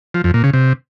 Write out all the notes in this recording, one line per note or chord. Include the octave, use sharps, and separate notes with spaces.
F3
F2
A#2
C#3
C3